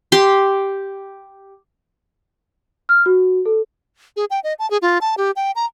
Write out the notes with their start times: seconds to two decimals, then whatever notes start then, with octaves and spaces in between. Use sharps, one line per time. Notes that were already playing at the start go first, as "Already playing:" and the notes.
0.12 G4 C6
2.89 F6
3.06 F#4
3.46 A4
4.16 G#4
4.31 G5
4.44 D#5
4.59 A5
4.71 G#4
4.82 F4
5.01 A5
5.18 G4
5.36 G5
5.56 A#5